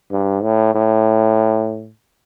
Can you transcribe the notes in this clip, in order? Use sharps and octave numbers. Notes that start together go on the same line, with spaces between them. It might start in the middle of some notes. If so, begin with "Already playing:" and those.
G2
A2
A2